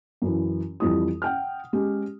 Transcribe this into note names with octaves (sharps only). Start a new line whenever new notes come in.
F#2 E3
F2 E3 G3 E4 D#6
F#5 G5 F6
G#3 C#4 G4